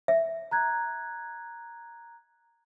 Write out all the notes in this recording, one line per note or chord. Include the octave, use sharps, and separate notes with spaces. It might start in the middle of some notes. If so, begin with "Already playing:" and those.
E5
A#5 F#6 G#6